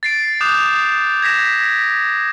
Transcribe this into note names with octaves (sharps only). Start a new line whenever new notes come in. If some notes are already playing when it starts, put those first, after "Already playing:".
A6 C7 D7
D6 D#6 F#6 G6 E7 F7
G#6 A#6 B6 E7